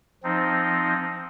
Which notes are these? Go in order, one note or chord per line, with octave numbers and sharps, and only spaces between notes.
F3 C4 D#4